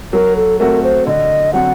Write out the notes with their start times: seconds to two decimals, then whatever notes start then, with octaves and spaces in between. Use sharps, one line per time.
0.13 F#3 A#4
0.36 A4
0.59 A3 C4 F#4 A#4
0.83 C5
1.07 D3 D#5
1.53 F#3 C4 F#4 F#5